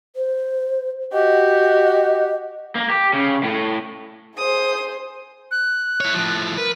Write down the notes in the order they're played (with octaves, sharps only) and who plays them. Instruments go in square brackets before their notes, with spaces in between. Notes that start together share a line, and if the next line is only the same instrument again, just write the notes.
[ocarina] C5
[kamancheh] F#4 G4 [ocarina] D#5
[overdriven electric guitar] A#3
G4
C#3
A2
[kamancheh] G#4 C5 [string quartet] D#6
[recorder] F#6
[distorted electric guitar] E4 C#5
A2 F3
[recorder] A#4 [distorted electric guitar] B4